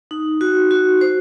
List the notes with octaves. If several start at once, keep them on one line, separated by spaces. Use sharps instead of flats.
D#4
F#4
F#4
C5